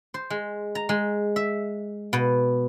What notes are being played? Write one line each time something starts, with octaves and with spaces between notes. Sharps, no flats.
C5
G#3
A#5
G#3
E5
B2